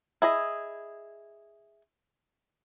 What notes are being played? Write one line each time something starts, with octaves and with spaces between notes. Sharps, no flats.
E4 G#4 D#5